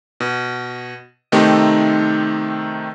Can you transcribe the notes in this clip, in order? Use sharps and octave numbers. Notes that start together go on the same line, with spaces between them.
B2
C3 D#3 A3 C4 D#4 G4